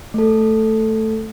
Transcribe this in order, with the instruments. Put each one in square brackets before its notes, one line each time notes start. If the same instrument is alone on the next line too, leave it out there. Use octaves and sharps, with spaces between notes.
[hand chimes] A3 A4